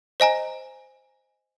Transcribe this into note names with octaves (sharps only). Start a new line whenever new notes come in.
C5 D#5 G#5 A#5